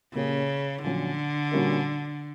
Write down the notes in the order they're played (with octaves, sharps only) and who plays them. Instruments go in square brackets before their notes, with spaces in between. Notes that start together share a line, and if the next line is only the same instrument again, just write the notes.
[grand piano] A#2 A#3 C#4 G4 [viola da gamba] C#3
[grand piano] A#1 A#2 F#3 C#4 [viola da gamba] D3
[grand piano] A#2 G3 C#4 F#4 A#4